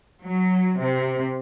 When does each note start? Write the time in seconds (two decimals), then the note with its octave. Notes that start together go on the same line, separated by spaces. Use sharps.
0.22 F#3
0.79 C3